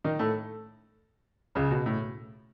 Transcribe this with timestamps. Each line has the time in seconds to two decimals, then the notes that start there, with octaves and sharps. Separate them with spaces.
0.04 D#3 D#4
0.19 A2 A3
1.55 C#2 C#3
1.71 B2
1.86 A2